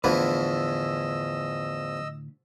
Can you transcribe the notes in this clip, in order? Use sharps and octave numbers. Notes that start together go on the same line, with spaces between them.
E2 A2 D3 E3 F3 B4 D#5 E6